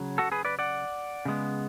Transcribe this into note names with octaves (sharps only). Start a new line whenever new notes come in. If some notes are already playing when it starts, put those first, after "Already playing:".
Already playing: C#3 F#3
F#4 A4
G#4 B4
B4 D5
D5 F#5
C#3 G#3 B3